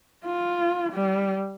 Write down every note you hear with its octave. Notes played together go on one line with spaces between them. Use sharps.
F4
G3